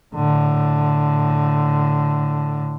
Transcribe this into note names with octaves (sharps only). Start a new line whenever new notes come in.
A2 D3